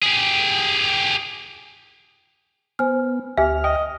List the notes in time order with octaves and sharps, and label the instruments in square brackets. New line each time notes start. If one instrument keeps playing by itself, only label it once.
[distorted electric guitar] G4 G#4
[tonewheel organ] B3 [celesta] C5 G#5 F6
[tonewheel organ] D2 F6 [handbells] G4 E5 [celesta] G#5
[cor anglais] D#5 [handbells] G5